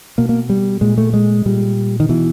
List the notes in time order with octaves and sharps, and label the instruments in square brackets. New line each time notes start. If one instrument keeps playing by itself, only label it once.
[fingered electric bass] B2 A#3
A#3
G3
A#2 G#3
A3
G#3
A#2 G3
D#3
B2 E3